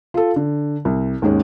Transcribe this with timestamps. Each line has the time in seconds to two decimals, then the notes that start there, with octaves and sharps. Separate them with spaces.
0.14 F4 A4
0.36 D3
0.85 C2
1.22 D#2 G#2 G#3 C#4